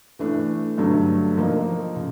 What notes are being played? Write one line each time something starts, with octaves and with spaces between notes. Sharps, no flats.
E3 A3 D4
G2 D3 F#3 A3
F3 A#3 D#4
C#3